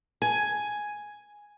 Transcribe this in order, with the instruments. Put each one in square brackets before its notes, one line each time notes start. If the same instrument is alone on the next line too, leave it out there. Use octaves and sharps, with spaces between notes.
[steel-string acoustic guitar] G#5